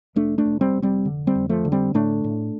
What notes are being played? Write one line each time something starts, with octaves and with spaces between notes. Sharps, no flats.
F1 A3 D4
A3 D4
F1
G3 C4
F1
G3 C4
D3
G3 C4
F2
F3 A3
D3
G3 C4
A2 A3 D4
A2